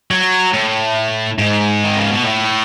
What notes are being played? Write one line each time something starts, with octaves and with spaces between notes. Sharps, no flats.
F#3
A2
G#2
D#3
C#3
B2
A2